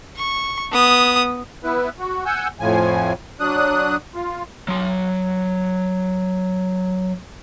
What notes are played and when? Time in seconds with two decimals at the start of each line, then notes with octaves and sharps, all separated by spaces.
0.16 C#6
0.72 B3 D#6
1.64 B3 E4 B4
1.99 F#4
2.26 F#5 G#5 E6 G6
2.60 F2 A2 F3 G#5
3.40 F#3 D4 D#6 F#6
4.15 F4
4.68 F#3 C6